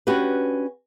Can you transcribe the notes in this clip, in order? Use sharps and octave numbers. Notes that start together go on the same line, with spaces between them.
C#4 D4 F#4 G4 B4